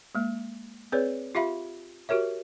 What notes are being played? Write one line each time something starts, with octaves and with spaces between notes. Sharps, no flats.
G#3 A#3
C4 G#4 B4 C#5 D5
F4 G4 E5 F5 B5
F#4 G4 A#4 C#5 E5